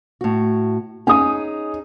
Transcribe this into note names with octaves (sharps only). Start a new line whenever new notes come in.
A2 F#4
C#4 D#4 G#4 G#5 D#6